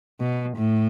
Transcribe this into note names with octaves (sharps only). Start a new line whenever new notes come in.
B2
A2